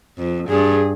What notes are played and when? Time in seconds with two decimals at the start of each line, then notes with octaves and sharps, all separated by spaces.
0.17 F2
0.49 G2 G#4